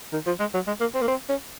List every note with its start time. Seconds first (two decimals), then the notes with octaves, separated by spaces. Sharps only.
0.13 D#3
0.27 F3
0.40 G#3
0.54 F#3
0.67 G#3
0.81 A#3
0.95 C4
1.02 A#3
1.08 C4
1.29 C#4